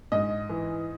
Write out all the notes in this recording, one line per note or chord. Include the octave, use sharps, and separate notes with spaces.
G#2 D#5
E3